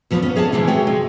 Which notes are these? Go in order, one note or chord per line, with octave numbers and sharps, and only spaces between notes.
E2 F3 B3 F4 C#5
B3 C#4
G#4 C#5 D5 E5 A5
C3 E3 G#3 E4 B4
C3 F#4 C#5 G5
G#3